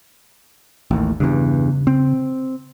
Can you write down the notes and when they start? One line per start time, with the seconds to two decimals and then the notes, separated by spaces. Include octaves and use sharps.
0.91 A1 D#2
1.20 E2 G2 C#3
1.87 C4